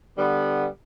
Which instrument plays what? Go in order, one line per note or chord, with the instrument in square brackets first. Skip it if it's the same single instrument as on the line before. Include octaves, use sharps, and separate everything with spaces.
[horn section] D3 G3 B3